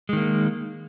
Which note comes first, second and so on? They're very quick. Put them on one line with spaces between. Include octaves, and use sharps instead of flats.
G#3 D#3 A#3